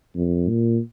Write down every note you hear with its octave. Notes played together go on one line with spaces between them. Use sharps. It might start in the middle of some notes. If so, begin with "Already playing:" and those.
F2
A#2